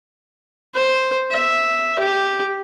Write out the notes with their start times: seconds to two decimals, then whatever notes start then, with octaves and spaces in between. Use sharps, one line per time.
0.75 C5
1.31 E5
1.99 G4